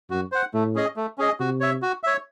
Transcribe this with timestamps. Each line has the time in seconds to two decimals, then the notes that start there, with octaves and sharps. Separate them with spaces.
0.10 F#2 F#4
0.32 C5 F#5
0.54 A2 A3
0.75 C#4 G#4 D#5
0.96 A3
1.18 C#4 G#4 D#5
1.40 C3 F#4
1.60 C#5 E5
1.82 F#4
2.03 C#5 E5